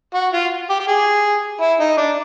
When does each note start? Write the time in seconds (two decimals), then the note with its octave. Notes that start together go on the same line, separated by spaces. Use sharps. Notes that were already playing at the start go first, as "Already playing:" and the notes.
0.15 F#4
0.33 F4
0.70 G4
0.80 G4
0.88 G#4
1.61 E4
1.80 D#4
1.98 D4